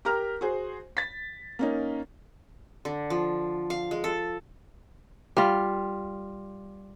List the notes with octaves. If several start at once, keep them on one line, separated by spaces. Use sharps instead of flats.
G4 A#4 A#5 F6
F#4 G#4 C5
A6 B6
A#3 C#4 D#4
D3
F3
F5
G#3
A4
G3 F4